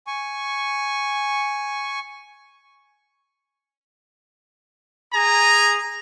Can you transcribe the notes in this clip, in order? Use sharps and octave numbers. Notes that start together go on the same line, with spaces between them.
G#5 C#6
G#4 G#5 A#5